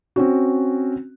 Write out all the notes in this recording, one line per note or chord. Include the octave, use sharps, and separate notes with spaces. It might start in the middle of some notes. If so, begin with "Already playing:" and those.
C4 C#4 F#4